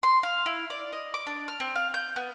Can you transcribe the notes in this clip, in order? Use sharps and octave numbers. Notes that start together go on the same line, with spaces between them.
C6
F5
E4
D5
D#5
D6
D4
F6
C4
F5
G6
B3